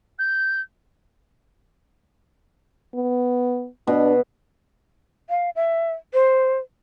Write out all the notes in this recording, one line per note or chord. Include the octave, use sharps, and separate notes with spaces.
G6
B3
B2 D4
F5
E5
C5